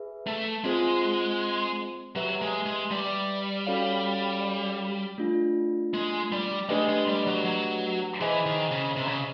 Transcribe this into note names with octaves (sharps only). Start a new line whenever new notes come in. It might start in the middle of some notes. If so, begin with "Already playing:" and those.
Already playing: G#4 B4 E5
A3
G#3 C4 F4 G#4 C5
F#3 G4 B4 E5
G#3
G#3
G3
C#4 F#4 A4 C#5 F5
A3 D4 F4
G#3
G3
G#3 A3 D4 G4 B4 D#5
G#3
G3
F#3
F#3
E3 G#4 C5 D#5 G#5
D#3
C#3
C3
C#3